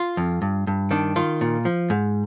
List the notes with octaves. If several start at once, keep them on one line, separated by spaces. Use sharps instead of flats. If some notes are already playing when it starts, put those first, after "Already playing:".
Already playing: F4
F2
G2
G2
D#3 D4
D#3 F4
A#2
F3
G#2